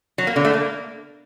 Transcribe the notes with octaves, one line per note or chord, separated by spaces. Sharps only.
F#3
A#3
D3
A3
A#3